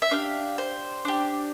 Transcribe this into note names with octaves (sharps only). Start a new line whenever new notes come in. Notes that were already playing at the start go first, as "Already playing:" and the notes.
E5
D4 G4 F5
C5
D4 G4